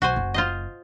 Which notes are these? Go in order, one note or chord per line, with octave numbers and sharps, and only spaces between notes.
B1 F#4 C5 G#5
F#1
F4 C5 D#5